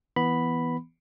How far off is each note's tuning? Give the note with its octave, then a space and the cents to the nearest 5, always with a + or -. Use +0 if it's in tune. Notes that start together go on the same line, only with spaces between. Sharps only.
E3 +0 B3 +0 B5 +0